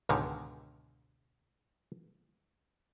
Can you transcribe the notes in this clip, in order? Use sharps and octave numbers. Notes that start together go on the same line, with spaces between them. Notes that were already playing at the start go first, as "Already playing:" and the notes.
C#2 G#2 B2 D3 D#3